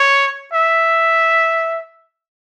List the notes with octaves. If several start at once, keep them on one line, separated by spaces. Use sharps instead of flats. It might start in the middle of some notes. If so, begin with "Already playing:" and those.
Already playing: C#5
E5